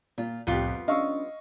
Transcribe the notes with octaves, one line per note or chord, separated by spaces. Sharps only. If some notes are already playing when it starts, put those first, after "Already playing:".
A#2 F4
C2 F2 A2 G3 B3 F4 G4
C#4 D4 D#5 F5 C#6 E6